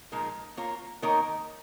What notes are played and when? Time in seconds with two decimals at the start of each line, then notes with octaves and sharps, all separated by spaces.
0.12 A#2 F3 G#3 D#4 A#4
0.57 A#3 F4 A#4 C#5
1.02 D#3 A#3 D#4 A#4 C#5